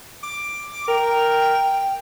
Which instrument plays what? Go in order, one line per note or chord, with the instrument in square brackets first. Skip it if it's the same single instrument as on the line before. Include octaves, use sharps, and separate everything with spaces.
[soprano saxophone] D6
[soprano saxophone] A#4 [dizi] G5